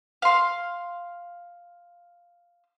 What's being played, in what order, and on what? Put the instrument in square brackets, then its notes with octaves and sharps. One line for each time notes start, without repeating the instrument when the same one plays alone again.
[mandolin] F5 C6